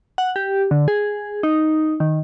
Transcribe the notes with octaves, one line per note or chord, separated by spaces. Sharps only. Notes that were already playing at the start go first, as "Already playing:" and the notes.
F#5
G4
D3
G#4
D#4
D#3